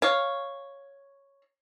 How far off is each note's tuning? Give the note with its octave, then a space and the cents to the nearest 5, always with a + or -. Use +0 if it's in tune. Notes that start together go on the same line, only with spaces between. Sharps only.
C#5 +0 F5 +0